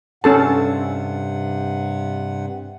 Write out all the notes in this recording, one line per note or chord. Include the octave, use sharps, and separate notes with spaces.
G2 C3 C#4 A4 F#5 A5